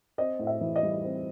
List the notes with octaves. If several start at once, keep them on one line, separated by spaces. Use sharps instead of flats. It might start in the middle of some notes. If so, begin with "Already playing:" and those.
C4 D#5
A2
E5
E3
D#5
G3
C4